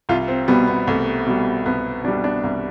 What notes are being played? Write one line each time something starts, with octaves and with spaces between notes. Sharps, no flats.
C2 F4
C4
B2 G3 B3
B3
C2 A3
B2 G3
C2 B3
B2 G3 D4
D4
C2